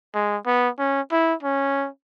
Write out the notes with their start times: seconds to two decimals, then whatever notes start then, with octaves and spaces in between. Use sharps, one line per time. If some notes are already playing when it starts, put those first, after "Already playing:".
0.15 G#3
0.46 B3
0.79 C#4
1.11 E4
1.43 C#4